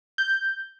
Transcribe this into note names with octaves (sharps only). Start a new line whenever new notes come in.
G6